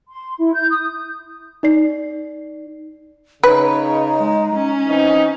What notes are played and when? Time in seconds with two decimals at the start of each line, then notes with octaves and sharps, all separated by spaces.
0.09 C6
0.39 E4
0.54 G6
0.70 D#6
1.63 D#4 D5 C7
3.43 C#3 D#4 B4 C#5
4.17 G#3
4.54 C#4
4.86 E3 C4 D#4